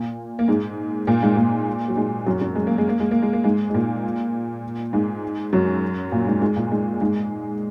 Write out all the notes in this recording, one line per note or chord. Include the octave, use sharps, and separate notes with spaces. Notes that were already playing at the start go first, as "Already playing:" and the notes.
Already playing: A#2 A#3
A#3
G#2 G#3
A#2 A#3
G#2 G#3
A#2 A#3
F#3
G#2 G#3
F#2 F#3
F#2 F#3
G#3
A#3
G#3
A#3
G#3
A#3
G#3
A#3
G#2 G#3
G#3
A#2 A#3
G#2 G#3
F#2 F#3
A#2 A#3
G#2 G#3
G#2 G#3
A#2 A#3
G#2 G#3
G#2 G#3